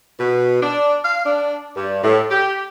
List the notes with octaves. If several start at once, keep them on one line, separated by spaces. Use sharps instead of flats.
B2
D4
F5
D4
G2
A2
G4